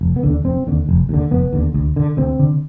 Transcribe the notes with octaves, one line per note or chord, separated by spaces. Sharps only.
F1
B3
D#2 D3
D4
F1 C4
D#2 D3
F1
D#2 D3
F1 B3
D#2 D3
D2
D3
D2 C4
D3